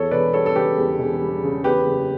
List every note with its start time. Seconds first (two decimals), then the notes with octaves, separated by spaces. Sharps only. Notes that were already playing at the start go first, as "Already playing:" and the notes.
Already playing: E2 A4 C#5
0.11 E1 B4 D5
0.33 G3 A4 C#5
0.46 A4
0.56 C#3 G4 B4
0.78 E2
0.99 E1
1.22 G3
1.44 C#3
1.64 E2 G4 B4
1.86 F#1